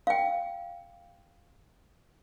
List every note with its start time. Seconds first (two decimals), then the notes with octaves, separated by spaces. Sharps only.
0.07 F5 G5